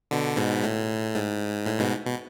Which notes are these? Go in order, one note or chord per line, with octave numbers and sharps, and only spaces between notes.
B2 D3
G#2 B2
A2
G#2
A2
G#2 B2
B2